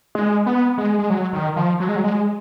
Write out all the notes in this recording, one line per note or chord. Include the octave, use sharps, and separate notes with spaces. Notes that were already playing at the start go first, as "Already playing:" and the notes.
G#3
B3
G#3
G#3
F#3
D#3
F3
F#3
G#3
F#3
G#3